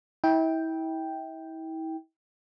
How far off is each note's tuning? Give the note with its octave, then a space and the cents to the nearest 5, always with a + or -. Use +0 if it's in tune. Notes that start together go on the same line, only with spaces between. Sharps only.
E4 -35 G5 +0